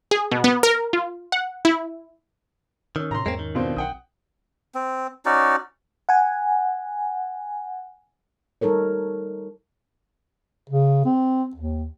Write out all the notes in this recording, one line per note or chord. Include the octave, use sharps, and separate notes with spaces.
G#4
B2
B3
A#4
F4
F#5
E4
D#3 C#4 E6
A2 C3 A#5 C6
E2 G#2 G#3 A#3 C4
D#3
B2 C4 D4 F4
B1 F#5 G5 D#6
C4
C#4 D#4 F#4 D5
F#5 G#5
G3 D#4 A4 A#4 C#5
C#3
C4
D#2